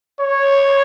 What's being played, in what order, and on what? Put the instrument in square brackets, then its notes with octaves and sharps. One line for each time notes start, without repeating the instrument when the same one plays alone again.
[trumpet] C#5